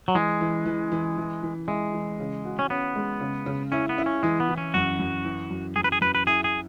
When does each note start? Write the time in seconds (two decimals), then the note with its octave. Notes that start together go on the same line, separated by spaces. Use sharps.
0.08 F#3
0.15 E3 G#3
0.41 E3
0.66 E3
0.92 E3
1.18 E3
1.43 E3
1.68 G#3 E4
1.94 E3
2.20 C#3
2.45 F#4
2.59 C#4
2.70 B3 C#4
2.95 G#3
3.21 C#3
3.46 C#3
3.72 C#4 E4
3.89 B3
3.98 E4
4.06 C#4
4.23 E3 G#3
4.40 B3
4.49 E3
4.58 C#4
4.74 F#2 F#4
4.99 F#2
5.25 E3
5.50 F#2
5.76 F#2 G#4
5.84 B4
5.92 G#4
6.01 F#2 B4
6.15 B4
6.27 E4 G#4
6.44 G#4